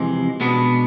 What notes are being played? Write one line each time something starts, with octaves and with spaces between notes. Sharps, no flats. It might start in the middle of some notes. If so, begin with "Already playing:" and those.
Already playing: F2 C3 E3 G#3
B2 G#3 B3 D4